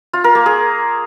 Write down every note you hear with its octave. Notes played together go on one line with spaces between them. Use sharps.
F4
A#4
A#3
G#4